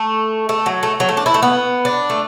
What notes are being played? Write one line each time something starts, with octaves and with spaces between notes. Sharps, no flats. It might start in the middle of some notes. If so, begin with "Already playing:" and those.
Already playing: A3
A3
F#3
A3
F#3
A3
D4
E4
A3
B3
D4
A3